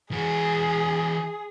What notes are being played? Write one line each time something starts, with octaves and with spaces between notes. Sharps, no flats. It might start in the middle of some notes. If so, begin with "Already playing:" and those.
E3 F#4 G#4